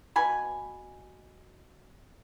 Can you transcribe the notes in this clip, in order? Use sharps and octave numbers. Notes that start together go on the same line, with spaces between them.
B2 G#5 B5